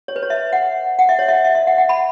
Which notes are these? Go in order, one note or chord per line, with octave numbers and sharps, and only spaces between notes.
C#5
B4
C#5
E5
F#5
F#5
E5
C#5
E5
E5
E5
F#5
F#5
B5